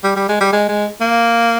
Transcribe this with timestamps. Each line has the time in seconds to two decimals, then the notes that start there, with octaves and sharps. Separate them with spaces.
0.04 G3
0.16 G3
0.29 G#3
0.40 G3
0.53 G#3
0.69 G#3
1.01 A#3